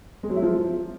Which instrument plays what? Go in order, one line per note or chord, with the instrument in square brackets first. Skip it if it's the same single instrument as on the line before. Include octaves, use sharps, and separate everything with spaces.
[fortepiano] G#3
F#3
E4
F3